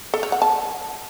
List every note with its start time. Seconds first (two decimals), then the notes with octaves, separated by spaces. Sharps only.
0.14 A4
0.23 C#5
0.32 F#5
0.42 A5